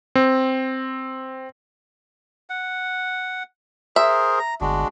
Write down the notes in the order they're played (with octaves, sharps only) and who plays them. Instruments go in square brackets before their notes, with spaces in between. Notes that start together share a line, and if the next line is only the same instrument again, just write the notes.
[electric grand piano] C4
[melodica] F#5
[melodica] G#4 A#4 C5 [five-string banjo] E5
[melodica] A#5
[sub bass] G1 [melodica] G#3 D4 F#4